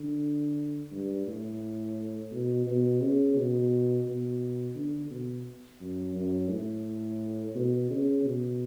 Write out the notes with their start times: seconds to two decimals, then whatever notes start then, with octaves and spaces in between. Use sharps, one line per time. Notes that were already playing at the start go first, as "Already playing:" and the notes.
Already playing: D3
0.92 G2
1.27 A2
2.32 B2
2.66 B2
3.01 C#3
3.36 B2
4.06 B2
4.75 D3
5.11 B2
5.81 F#2
6.16 F#2
6.50 A2
7.55 B2
7.90 C#3
8.25 B2